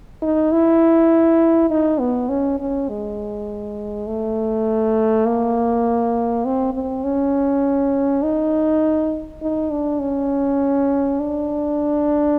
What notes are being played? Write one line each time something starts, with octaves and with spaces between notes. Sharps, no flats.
D#4
E4
D#4
B3
C#4
C#4
G#3
A3
A#3
C4
C4
C#4
D#4
D#4
D4
C#4
D4